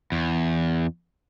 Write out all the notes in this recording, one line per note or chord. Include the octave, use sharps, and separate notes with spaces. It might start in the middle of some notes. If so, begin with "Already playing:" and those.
E2